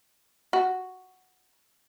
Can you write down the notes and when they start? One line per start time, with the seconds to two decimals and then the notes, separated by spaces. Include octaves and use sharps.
0.53 F#4